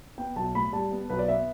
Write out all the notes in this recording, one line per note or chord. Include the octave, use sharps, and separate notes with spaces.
B3 G5
B1 A5
A2 B5
G3 A5
B3
B1 B4
D5
B3 E5